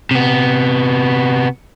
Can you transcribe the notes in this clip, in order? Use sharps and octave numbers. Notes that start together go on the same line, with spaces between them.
C3 B3